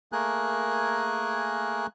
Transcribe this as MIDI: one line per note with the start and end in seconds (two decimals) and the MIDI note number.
0.12 1.87 57
0.12 1.87 58
0.12 1.87 68
0.12 1.87 70
0.12 1.87 80
0.12 1.87 90